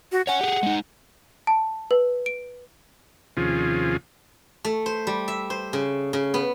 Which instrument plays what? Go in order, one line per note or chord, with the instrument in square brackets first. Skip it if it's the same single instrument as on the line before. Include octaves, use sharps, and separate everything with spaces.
[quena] F#4
[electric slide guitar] C#5 G#5 [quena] F#5
[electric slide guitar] G4 G#4
G#3 D#4
[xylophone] A5
B4
D7
[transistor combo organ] D#2 C3 F3 C#4 F4 G#4
[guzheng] A3
C5
G3
E5
C5
C#3
C#3
B3